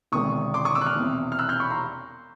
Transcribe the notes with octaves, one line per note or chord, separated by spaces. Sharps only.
E1 D2 C3 D#3 G#3 C#6 D#6
C6 D6
C#6 D#6
D6 E6
F#6
D#6 F6
E1 E2 C3
F6
E6 F#6
F6 G6
B5 C#6
A#5 C6